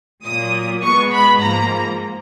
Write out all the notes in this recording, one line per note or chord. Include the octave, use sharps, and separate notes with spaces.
A#2 F#3 A#3 D#6
B2 G#3 B3 C#6
B5
G#2 F3 A#3 A#5